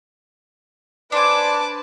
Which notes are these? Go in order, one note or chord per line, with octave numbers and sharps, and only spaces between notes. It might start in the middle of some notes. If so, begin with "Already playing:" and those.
D4 B4 C5 D5 G#5 A5 D6